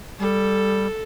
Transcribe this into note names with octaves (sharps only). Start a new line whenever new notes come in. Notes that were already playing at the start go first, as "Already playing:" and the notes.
G3 A4